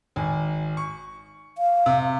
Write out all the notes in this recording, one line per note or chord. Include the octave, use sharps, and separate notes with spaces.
G#1 G#5
C#6
F5
C3